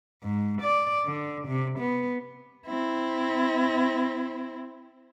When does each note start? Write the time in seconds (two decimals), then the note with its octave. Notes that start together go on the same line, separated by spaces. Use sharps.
0.23 G#2
0.62 D5
1.06 D3
1.48 C3
1.79 B3
2.66 C4 E4